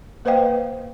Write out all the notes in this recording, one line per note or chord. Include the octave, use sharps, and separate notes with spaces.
A#3 B4 C5 D#5 F5 G5